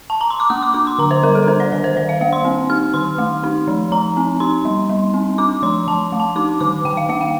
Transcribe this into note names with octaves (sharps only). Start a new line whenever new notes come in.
A5
A#5
C6
D6
A#3 D#6
D6
D4 D6
C6
D3 A#5
C5
G3 A#4
A4
D4 C5
D5
D#3 D5
C5
D#3 D5
F5
A#3 F5
C6
C4
D#4 F6
D#3 C6
A3
D#4
F3
F3 A#5
C4
D#4 C6
G3
G3
C4
D4 D6
F3 C6
F3 A5
A3
A5
D#4 D6
D#3 D6
D#3 G5
F5
A#3 F5
G5